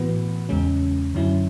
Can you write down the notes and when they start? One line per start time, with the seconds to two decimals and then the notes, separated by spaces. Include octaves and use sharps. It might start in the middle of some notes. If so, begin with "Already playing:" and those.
Already playing: A2 E3 B3 F#4 B4
0.49 E2 C#3 G#3 C#4
1.15 F#2 D3 F#3 C#4 E4